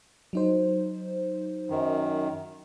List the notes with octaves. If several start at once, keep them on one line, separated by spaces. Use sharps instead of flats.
F#3 D#4 C5
F#2 D#3